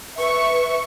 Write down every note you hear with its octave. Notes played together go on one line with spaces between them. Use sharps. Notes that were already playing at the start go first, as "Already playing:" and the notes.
B4 E5 C#6